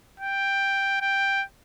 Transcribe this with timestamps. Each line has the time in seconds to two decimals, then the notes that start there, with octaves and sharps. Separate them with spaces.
0.20 G5
1.01 G5